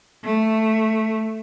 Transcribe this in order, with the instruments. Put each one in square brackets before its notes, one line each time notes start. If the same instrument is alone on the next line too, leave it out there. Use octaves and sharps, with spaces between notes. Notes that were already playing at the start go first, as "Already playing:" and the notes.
[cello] A3